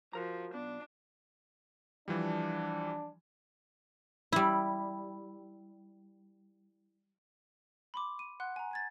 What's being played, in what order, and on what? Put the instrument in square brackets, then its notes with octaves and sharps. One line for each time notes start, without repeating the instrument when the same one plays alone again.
[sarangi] F3 [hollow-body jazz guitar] F#4 A#4 A#5
[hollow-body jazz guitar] B1 B3 [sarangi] D4
[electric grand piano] E3 F3 G3 [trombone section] D4
[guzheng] G3 E4
[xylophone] B5 C6 D6
D#7
F#5 C6 F#6
G#5 A#5
G#5 G#6 A6